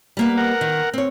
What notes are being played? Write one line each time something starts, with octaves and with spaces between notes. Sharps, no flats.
G3 A#3 B3
A#4 F#5
D#3
C4 C#5